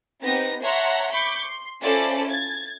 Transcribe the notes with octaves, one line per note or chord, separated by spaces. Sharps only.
B3 C4 D#4 G4 A#6
C#5 E5 F#5 A5 A#5 C6
B5 C#6 D6 G6
C6
C#4 E4 F4 A4 C5 D5
G#6 A6